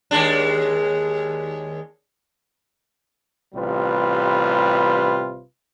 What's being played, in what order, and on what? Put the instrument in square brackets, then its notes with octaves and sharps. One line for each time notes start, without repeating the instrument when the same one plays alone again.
[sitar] D#2 G#3 D4
[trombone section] A1 C3 G3 F4 B4